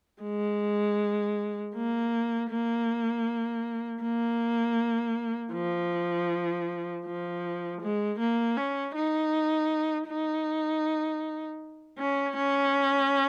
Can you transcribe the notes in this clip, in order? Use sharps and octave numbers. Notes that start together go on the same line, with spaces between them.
G#3
A#3
A#3
A#3
F3
F3
G#3
A#3
C#4
D#4
D#4
C#4
C#4